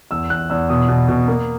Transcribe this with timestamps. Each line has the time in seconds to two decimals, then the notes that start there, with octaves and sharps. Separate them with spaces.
0.11 E2 E6
0.30 E2 F#6
0.50 E2 E6
0.69 B2 D#6
0.89 B2
1.08 B2
1.28 A#3